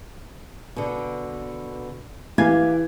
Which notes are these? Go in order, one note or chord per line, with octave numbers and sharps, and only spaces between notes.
B2 D3
E3 G4 F5 G#5 G#6